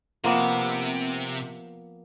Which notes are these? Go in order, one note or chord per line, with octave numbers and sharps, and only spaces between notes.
C3 F3 A#3 B3